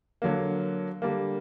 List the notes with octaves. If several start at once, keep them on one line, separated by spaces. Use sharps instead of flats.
D3 F#3 A#3
D3 G3 A#3